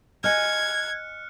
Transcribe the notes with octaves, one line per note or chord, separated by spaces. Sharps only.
D#5 G#5 F6 F#6 G#6 C#7